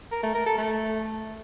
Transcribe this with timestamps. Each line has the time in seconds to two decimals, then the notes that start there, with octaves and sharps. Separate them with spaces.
0.12 A#4
0.23 A3
0.35 A#4
0.46 A4
0.58 A3